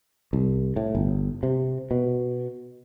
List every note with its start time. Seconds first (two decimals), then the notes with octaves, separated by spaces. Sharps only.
0.33 C2
0.76 A2
0.95 G1
1.43 C3
1.91 B2